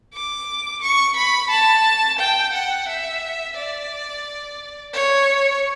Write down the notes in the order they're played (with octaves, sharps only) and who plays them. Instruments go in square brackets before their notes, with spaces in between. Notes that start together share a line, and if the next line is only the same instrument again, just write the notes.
[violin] D6
C#6
B5
A5
G5
F#5
E5
D5
C#5